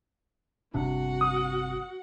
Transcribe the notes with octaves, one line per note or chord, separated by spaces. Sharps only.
G1 C3 D4 F#4 F#5
D#6